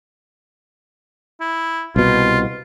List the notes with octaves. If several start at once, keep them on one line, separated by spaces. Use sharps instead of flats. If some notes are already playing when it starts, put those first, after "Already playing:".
E4
C2 B2 F4